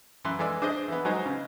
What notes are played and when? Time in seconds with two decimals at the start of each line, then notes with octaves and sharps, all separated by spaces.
0.25 F#2 E3 B4 C6
0.39 E3 G#3 D5 E6
0.62 D4 G#4 C5 D#5
0.88 E3 B3
1.05 F#3 G#3 D#4 C5
1.26 C#3